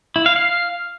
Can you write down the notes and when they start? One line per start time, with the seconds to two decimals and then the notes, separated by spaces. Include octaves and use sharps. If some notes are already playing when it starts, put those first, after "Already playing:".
0.16 E4
0.26 F5
0.36 F5